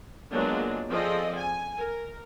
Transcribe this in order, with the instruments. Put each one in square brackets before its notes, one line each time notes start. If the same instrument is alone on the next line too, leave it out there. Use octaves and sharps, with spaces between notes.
[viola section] F#3 G#3 A#3 B3 D4 F4
F3 C4 G#4 A4 D5 D#5
G#5
A#4